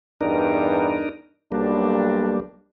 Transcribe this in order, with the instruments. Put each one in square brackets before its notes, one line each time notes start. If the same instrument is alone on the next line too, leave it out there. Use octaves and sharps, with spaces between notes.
[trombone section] E2 G2 [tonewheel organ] D4 D#4 A#4
[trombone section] B1 D4 [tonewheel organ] G3 A#3